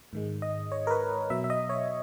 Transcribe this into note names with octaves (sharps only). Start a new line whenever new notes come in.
G#2 D#3 G#3
D#5
C#5
A#4
B4
B2 F#3 E5
E5
D#5
C#5